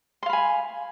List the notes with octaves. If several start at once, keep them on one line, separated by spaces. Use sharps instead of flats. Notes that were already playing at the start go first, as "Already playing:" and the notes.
F5 G#5 B5 C6